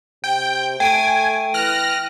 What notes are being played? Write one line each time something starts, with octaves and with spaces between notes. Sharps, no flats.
C3 G5
A3 G5 G#5 D7 D#7
E3 F6 F#6 A#6